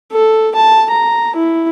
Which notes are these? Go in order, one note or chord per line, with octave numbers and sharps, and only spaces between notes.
A4
A5
A#5
E4